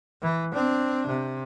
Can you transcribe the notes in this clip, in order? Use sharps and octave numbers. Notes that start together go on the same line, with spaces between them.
E3
C4 D4
C3